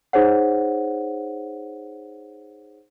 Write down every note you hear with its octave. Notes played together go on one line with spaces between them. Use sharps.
D#4 G#4 C5 C#5 F#5